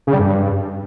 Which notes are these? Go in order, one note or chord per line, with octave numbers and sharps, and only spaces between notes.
C#3
G3
G2